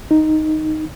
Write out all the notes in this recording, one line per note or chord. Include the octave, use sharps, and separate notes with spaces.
D#4